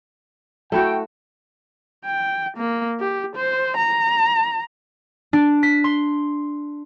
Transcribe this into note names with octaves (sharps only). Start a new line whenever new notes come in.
A3 E4 F#4 G5
G5
A#3
G4
C5
A#5
D4
B6
C6